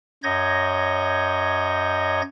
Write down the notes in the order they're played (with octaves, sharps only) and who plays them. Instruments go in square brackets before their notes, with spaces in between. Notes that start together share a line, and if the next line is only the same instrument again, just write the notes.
[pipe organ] F#2 C#5 D#5 G6 G#6 A#6